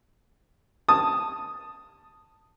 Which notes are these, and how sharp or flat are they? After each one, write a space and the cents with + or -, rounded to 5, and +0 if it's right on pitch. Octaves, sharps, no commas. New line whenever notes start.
A5 +10 D#6 +0